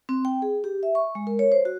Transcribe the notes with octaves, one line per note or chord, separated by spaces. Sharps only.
C4
G5
G#4
G4
E5
C#6
G#3
A#4
C#5
C5
F#4